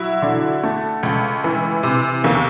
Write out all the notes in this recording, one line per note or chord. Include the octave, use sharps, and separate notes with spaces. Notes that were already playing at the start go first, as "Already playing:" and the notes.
Already playing: F#3 E4
D3
A3
C#2
E3
C3
D#2